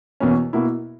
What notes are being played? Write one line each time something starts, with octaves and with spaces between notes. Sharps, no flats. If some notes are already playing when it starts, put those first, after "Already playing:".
E2 B2 A#3 C#4
B2 A#3 E4